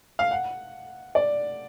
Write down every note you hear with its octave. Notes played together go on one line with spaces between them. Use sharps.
F5
F#5
D5